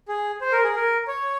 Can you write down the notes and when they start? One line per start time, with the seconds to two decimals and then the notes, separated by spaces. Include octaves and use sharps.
0.08 G#4
0.41 C5
0.52 A#4
0.64 G#4
0.75 A#4
1.07 C#5